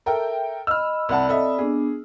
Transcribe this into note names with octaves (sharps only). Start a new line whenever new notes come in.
A4 A#4 E5 G5
D#5 B5 E6 F6
C2 C4 D5 F#5 A5 B5
A4 D#5 E5
B3 D4 G#4